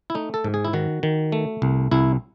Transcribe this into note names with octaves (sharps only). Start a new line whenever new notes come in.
E4
A3 D#4
A4
G#2
G#4
E4
D#3 F#4
D#3
A3
C2
C2 E4